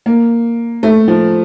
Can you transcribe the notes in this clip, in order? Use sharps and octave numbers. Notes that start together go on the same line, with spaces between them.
A#3
A3
F3